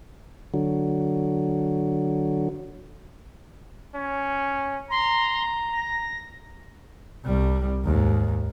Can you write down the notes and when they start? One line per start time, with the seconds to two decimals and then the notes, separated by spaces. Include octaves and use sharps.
0.54 D3 F#3
3.95 C#4
4.90 A#5 C6
5.73 A#6
7.25 C2 G3
7.84 D#2 G#2